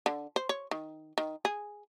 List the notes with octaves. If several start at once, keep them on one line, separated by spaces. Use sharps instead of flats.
D3
C5
C#5
D#3
D#3
G#4